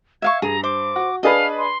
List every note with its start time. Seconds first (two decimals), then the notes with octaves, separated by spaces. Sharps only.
0.22 E5 F5 C#6 G#6
0.42 G2 G#4 A#5
0.64 C5 D6
0.96 F#4
1.23 D4 G#4 B4 D#5 F5 A5 D#6
1.58 C6